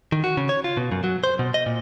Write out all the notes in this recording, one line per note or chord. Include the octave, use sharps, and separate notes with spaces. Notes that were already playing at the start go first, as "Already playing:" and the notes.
D#3
F#4
C#3
C#5
F4
B2
F#2
F#3
C5
B2
D#5
A#2